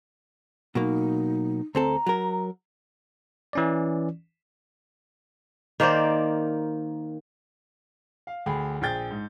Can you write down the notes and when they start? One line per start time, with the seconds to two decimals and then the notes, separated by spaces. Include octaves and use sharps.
0.75 B2 F#3 A#3 D#4
1.75 D2 C4 A4 A#5
2.07 F#3 A#4
3.53 E3 C#4 D5
5.80 D#3 A#3 C5 D5
8.27 F5
8.46 D2 G#4 G5 B5
8.81 A#1 G#4 G5 G6 A6
9.11 G#2